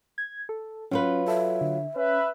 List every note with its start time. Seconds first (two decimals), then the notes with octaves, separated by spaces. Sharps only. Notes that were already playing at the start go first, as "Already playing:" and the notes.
0.18 G#6
0.49 A4
0.91 F#3 C#4 F4 B4
1.28 A4 E5
1.61 D3
1.96 C#4 B4 E5